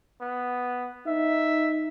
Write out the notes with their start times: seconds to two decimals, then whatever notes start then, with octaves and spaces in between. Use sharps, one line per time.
0.21 B3
1.07 D#4 E5